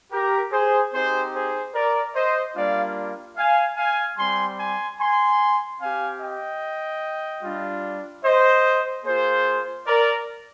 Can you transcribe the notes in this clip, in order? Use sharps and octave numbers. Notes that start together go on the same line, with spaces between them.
G4 A#4
G#4 C5
C4 D#4 G4 G#4 C5
G#4 C5
A#4 D5
C5 D#5
G3 A#3 D4 F4 D5 F5
F5 G#5
F5 G#5
G3 C4 G4 G#5 C6
G#5 C6
G#5 C6
C4 G4 F5 G#5
D#5 G5
G3 D4 F4
C5 D#5
A#3 F4 G#4 C5
A#4 D5